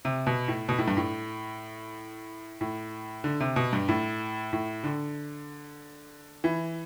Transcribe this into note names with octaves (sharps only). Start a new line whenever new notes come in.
C3
B2
A2
B2
A2
G2
A2
A2
D3
C3
B2
G2
A2
A2
D3
E3